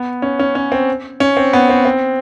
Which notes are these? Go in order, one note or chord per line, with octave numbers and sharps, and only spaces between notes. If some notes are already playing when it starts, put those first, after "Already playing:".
Already playing: B3
C#4
C#4
C#4
C4
C#4
C4
B3
C4
C4